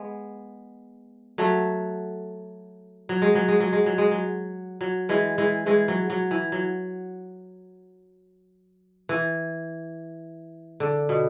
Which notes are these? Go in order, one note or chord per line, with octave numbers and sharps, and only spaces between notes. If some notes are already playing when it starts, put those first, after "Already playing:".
Already playing: G#3 B3
F#3 A3
F#3
G#3
F#3
G#3
F#3
G#3
F#3
G#3
F#3
F#3
E3 G#3
E3 G#3
E3 G#3
F#3
F#3
E3
F#3
E3
D3
B2